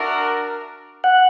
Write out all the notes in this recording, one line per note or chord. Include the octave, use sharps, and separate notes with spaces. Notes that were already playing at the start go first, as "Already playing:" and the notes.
Already playing: D4 F#4 A#4 E5
F#5